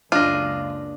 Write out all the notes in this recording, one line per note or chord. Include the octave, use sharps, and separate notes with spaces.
F#1 C#2 D4 F4 D#5